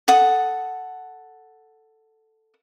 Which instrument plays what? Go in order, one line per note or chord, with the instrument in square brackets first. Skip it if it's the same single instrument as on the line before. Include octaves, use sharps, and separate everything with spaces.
[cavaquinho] A4 F#5 D#6